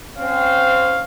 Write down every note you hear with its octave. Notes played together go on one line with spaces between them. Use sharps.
C4 C#4 F5